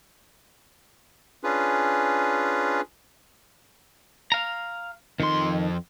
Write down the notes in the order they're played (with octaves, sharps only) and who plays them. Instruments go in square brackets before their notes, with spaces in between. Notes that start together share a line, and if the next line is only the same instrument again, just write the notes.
[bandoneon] C#4 D4 F4 G#4 B4
[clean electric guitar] F5 A#5
[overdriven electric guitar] F2 C6 [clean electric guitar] D#3